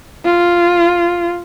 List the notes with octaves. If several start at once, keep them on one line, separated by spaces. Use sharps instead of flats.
F4